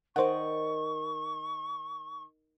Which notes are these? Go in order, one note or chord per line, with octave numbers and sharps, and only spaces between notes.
D#3 C5 D5 D#5 F#5 C#6